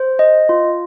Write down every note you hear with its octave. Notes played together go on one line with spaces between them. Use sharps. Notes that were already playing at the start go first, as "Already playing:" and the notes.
Already playing: C5
D#5
F4